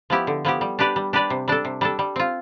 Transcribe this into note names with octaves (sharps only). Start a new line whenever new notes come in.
F3 B3 E4 G4
D3
F3 B3 E4 G4
G3
D4 G4 B4 D5
G3
D4 G4 B4 D5
C3
G3 D4 A4
C3
G3 D4 A4
G3
C4 F4